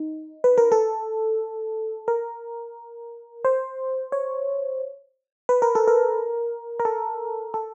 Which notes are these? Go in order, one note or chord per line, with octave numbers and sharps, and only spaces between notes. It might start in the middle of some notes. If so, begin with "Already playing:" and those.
Already playing: D#4
B4
A#4
A4
A#4
C5
C#5
B4
A#4
A4
A#4
A#4
A4
A4